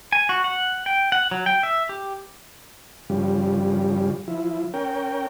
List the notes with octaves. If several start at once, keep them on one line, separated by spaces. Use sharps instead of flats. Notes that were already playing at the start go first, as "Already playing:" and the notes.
G#5
F#4
F#5
G5
F#5
F#3
G5
E5
G4
G2 C#3 F3 G3
F3 E4
C#4 A#4 G5